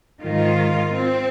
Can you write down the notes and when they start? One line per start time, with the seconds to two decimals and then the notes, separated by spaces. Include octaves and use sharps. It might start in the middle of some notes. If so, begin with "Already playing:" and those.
0.22 G#2 D#3 F4
0.96 C4